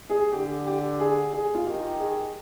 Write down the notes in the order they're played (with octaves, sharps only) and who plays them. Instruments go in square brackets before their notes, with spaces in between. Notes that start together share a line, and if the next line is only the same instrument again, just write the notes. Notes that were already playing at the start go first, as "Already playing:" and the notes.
[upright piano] G#4
[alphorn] D3 [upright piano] G4
[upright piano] G4
G#4
G#4
F4
[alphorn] D#3 [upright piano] G4
[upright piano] G#4